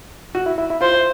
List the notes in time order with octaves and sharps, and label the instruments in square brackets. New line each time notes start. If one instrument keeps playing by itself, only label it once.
[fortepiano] F#4
E4
E4
E4
[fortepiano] F4 [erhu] C5